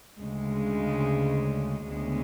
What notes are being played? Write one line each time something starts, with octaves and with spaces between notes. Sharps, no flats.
D2 C#3 G#3
D2 C#3 G#3 B3